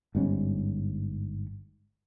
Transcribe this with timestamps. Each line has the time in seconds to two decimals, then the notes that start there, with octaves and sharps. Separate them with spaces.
0.15 G1 G#2 G3 C#4